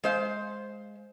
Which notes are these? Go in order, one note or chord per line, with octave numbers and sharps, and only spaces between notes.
G#3 C5 F5